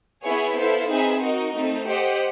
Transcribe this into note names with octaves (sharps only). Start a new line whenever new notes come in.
B3 E4 G#4 C#5
B3 E4 A4 C5 F5
C4 D#4 G#4 B4 E5
D#4 F#4 A#4 D#5
A3 C4 D#4
G4 C5 D#5 F#5